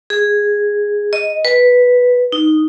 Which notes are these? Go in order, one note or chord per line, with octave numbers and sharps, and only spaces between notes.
G#4
D#5
B4
D#4